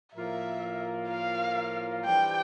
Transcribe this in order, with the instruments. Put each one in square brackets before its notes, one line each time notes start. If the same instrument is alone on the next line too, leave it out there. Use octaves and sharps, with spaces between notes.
[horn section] A2 F3 A#3 F4 A#4 [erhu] E5
[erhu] F5
[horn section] E3 G3 D4 G4 C5 [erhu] G5